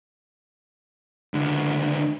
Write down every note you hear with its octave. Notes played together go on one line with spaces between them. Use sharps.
C#2 D3